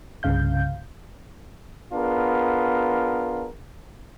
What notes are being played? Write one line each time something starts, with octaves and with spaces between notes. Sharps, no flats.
C2 G2 C#3 F5 G6
B3 D4 F4 G#4 A#4